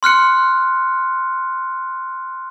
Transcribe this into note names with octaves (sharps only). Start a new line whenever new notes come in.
C6 F6 F#6 C#7